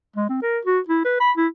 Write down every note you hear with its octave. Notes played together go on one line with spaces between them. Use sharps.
G#3
C4
A#4
F#4
E4
B4
B5
E4